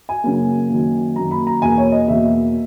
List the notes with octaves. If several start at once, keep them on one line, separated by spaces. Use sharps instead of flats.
G#5
F#2 C#3 F#3 A#3
F#2 D#3 A#3
F#2 D#3 A#3 A#5
B5
A#5
E2 B2 A#3 G#5
C#5
D#5
E2 B2 A#3 E5